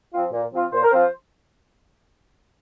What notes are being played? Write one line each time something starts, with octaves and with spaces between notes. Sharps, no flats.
F3 C4 F4
A#2
F3 C4 F4
A#2 C5
A#4
F3 C4 F4 C5